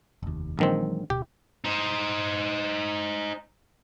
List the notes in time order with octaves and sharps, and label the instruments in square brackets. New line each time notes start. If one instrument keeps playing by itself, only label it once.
[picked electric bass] F1 D#2
[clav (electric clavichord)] A#1 D#3 C4 [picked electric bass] E3 F#3 G#3
[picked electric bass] D1 B2 [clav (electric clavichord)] G4
[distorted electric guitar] D#4 C5